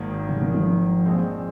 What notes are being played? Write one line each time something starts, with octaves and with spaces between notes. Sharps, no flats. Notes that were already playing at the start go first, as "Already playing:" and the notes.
Already playing: G#1 G#2 D#3 A#3
C3
D#3
F3
A#1 A#2 G#3 C4